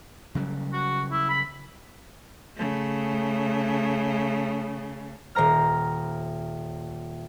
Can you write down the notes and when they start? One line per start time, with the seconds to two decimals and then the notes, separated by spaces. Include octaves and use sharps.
0.35 C#3 F#3 G3
0.73 F#4
1.12 E4
1.29 B5
2.56 C#3 A3
5.35 D#1 C5 A#5 F6